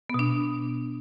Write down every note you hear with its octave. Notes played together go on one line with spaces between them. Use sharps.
B2 B3 D4